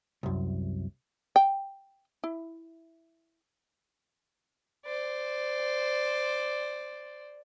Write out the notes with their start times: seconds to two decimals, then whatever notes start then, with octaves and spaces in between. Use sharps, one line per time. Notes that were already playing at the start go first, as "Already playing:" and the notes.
0.23 C2 F#2
1.36 G5
2.24 E4
4.85 C5 D5